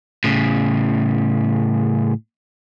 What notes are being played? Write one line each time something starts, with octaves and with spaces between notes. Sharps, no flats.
A2 C#3